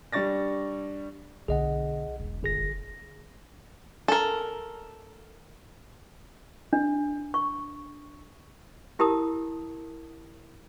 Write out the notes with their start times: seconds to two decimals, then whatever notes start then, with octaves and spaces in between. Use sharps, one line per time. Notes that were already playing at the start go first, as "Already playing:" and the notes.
0.13 G3 D4 C#6 A6 A#6
1.48 B1 D3 G#4 D#5 F#5
2.20 E1
2.43 G1 G#4 A#6
4.08 A4 A#4
6.73 D4
7.34 C#6
8.99 E4 G4 A#4 A5 D#6